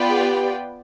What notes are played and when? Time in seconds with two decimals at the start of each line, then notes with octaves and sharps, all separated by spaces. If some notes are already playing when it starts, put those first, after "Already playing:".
Already playing: B3 F4 B4 D5 G5
0.09 G#4
0.20 G4